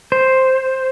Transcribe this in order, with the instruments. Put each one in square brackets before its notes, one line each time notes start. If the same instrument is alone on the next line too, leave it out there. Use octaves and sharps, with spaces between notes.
[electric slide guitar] C5